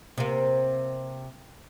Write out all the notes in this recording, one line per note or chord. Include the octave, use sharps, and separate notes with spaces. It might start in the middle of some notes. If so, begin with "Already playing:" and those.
C3 A#3